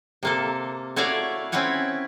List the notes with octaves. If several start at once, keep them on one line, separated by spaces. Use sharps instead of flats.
C3 A#3 A4
A3 E4 F#4 C#5 D5 F5
C4 C#4 E4 B4 F#5 G#5